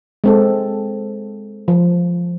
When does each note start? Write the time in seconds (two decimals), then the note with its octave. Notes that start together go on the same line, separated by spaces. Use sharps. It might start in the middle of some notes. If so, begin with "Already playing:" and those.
0.24 G#3 C4 A4
1.68 F3